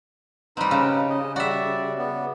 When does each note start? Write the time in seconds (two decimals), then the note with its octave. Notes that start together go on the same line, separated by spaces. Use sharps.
0.57 G3 C4 D#4 B4
0.71 C#3
1.10 D#5
1.36 G3 F#4 D5 E5
1.98 B3